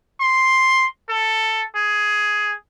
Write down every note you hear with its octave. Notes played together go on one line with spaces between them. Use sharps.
C6
A4
G#4